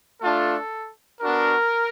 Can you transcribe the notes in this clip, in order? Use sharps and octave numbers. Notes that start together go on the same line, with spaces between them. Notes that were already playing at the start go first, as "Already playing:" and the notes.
A3 D4 F4 A4
B3 D4 F#4 A#4